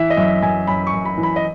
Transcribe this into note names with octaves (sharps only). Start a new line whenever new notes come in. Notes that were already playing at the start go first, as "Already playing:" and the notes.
Already playing: E3 E5
D#5
F#2 E5
F#2 G#5
F#2 B5
C#6
F#2
B5
E3
B5
D#5